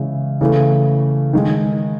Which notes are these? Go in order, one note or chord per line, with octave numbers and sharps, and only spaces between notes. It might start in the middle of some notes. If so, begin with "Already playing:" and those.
Already playing: C#3 E3 G#3 E5
C#3 E3 A3
D#3 G#3